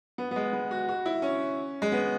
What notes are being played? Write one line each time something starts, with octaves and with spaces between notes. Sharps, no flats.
B3
B3
G#3
B3
F#4
F#4
E4
C#4
G#3
B3